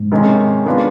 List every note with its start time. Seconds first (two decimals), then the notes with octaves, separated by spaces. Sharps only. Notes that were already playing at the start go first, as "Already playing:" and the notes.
Already playing: G#2
0.12 C3 D#3 G#3 C#4
0.66 D#3 G#3 B3 D4 F4